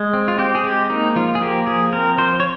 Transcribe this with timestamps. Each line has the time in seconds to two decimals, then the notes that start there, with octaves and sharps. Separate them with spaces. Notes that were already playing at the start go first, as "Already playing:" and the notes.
Already playing: G#3
0.13 C4
0.28 F4
0.38 C4 G4
0.55 G#4
0.64 G#3 G4
0.90 A#3 D#4
1.16 F3 F4
1.35 G#4
1.42 A#3 G4
1.67 F3 G#4
1.93 C4 A#4
2.18 F3 C5
2.40 C#5